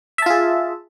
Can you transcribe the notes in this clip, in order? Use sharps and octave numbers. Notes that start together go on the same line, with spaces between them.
F4 G#4 E5 A5